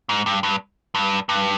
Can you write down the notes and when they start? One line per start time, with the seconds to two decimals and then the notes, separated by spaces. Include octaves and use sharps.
0.09 G#2
0.26 G2
0.43 G2
0.95 G2
1.29 G2